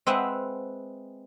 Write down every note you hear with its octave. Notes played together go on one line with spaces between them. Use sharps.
G#3 C4 B4 E5 F#5